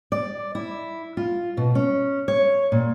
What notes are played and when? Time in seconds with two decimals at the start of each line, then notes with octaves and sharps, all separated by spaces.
0.12 D5
0.55 E4
1.17 F4
1.57 B2
1.75 C#4
2.28 C#5
2.72 A#2